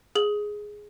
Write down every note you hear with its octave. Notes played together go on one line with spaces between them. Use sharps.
G#4 F#7